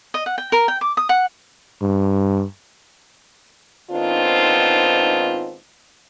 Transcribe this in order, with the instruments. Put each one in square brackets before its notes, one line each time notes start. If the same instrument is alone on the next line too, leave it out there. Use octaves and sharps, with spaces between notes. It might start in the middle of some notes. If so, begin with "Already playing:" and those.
[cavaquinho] D#5
F#5
G5
A#4
G5
D6
D#6
F#5
[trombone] G2
[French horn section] G#2 D#3 B3 C4 D4 F4